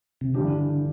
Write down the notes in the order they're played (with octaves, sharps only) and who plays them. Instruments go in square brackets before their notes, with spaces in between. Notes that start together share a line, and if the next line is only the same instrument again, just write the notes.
[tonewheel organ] C3
[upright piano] G2 E3 G3 D4 G4 [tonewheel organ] D3